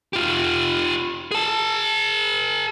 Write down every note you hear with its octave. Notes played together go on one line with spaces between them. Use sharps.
F4 G4
G#4 A5